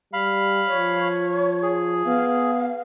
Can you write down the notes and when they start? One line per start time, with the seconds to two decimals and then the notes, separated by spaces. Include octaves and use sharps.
0.13 G3 F5 B5
0.68 F3 C#5
1.63 G#4
2.06 B3 F5